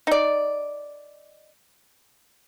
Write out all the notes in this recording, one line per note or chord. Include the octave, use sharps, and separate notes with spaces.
D#4 D5